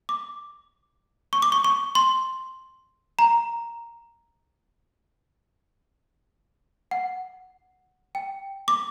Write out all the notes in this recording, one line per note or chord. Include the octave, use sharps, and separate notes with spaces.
D6
C#6
D6
C#6
C#6
C6
A#5
F#5
G5
D6